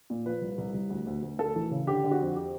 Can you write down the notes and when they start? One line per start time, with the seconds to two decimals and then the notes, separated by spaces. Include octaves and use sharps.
0.10 A#2
0.26 F3 B4
0.41 C2
0.58 C2
0.74 C2
0.90 D2
1.07 D2
1.22 D2
1.39 D2 A4
1.56 E3
1.71 C#3
1.87 D3 G4
2.04 D3
2.11 F#4
2.20 F2
2.36 G4